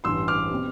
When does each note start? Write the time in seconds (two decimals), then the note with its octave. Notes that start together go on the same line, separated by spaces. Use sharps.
0.04 A1 G2 E3 C6 E6
0.28 D6 F6
0.51 B2 G3 C4